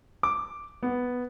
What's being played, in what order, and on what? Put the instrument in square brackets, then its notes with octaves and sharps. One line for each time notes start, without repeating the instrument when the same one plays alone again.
[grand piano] D6
B3